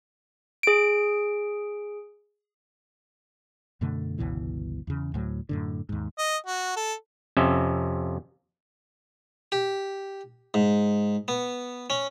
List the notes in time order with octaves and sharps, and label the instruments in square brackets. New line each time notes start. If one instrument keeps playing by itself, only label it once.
[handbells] G#4 D7
[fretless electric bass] F#2 B2 D3 A3
G1 C#2 B2 E3
E2 C#3
D2 A2 F#3
F#2 A2 D3
D#2 G#2
[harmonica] D#5
F#4
A4
[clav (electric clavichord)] F2 C3 C#4 E5
[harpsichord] G4
G#2
B3
C#4